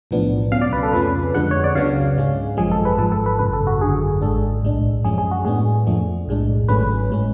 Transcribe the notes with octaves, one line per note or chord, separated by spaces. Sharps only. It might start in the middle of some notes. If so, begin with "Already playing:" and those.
B1 A2 F3 B3 D4
C#2 B2 F#3 C#4 F5
D5
B4
A4
F2 C#3 F3 A3 C#4 B4
F2 D3 G#3 D4 F#5
C#5
D5
C#2 C#3 F#3 B3 D4 F5
G#2 G#3 C#4
G#1 F#2 F3 G#3 G#4
A4
B4
G#1 G#2 F3 A4
A4
B4
G#1 F#2 C#3 B4
A4
F#4
G#1 F#2 D3 G#4
G#1 G#2 G#3 D4 A4
B1 A2 G#3 D4
F#2 F3 G#3 C#4 G#4
G#4
F#4
A2 G#3 B3 D4 G#4
F2 F3 A3 D4
B1 A2 G#3 D4
G#1 G#2 F#3 A3 C#4 B4
A2 G#3 C#4